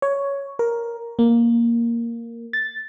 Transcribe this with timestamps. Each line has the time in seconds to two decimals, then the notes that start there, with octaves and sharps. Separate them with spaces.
0.02 C#5
0.59 A#4
1.19 A#3
2.53 A6